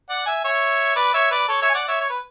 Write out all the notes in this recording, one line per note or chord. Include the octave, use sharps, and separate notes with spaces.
D5 F#5
E5 G#5
C#5 E5
B4 D5
C#5 E5
B4 D5
A4 C#5
C#5 E5
G#5
D5 F#5
C#5 E5
C#5
B4